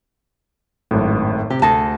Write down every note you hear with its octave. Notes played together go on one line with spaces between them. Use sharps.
G#1 F#2 A2
C3 G4
D2 G#4 A4 A5 A#6